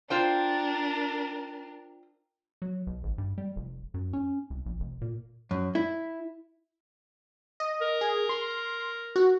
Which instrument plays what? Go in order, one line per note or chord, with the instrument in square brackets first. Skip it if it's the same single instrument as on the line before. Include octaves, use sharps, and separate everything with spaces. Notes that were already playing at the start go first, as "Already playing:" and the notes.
[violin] D4 A#4 [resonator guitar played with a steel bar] F4 C5 G5
[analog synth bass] F#3
B1
G#1
G2
G3
F1
F#2
C#4
C2
A#1
F1
A#2
[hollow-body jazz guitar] F#2
E4
[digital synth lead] D#5
[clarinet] A#4
[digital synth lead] G#4
C6
F#4